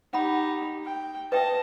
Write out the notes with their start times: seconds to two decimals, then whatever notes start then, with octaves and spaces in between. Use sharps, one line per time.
0.13 D#4 G4 F#5 B5
0.85 G5
1.32 B4 D#5 E5 G5 A5